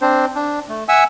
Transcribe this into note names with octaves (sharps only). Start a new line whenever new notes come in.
C4 D4 C5
D4
A3
E5 F#5 G#5 E6